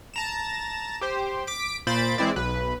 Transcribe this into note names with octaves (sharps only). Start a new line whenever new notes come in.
A5 A#5 E7
G4 C5
D6 B6 D7
A#2 C5 B5 A6 D7
E3 G#3 C4 E4 D5
B1 B4